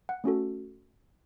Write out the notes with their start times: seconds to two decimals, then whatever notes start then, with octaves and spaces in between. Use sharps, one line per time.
0.09 F#5
0.24 A3 C#4 F#4 A4